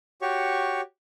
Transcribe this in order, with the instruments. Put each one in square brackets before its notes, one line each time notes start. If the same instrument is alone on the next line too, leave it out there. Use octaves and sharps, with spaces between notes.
[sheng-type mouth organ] F#4 G4 C#5 C#6